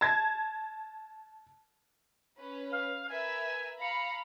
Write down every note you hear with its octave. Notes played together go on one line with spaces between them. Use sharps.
A5 G#6
C#4 B4
F5
A#4 B4 E5 G#5
F5 A#5 B5 C#7